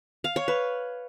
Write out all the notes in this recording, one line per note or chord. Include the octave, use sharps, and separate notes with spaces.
F5
C#5
B4